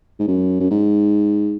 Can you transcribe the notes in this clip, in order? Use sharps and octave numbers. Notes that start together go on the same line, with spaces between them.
G#2
F#2
F#2
G#2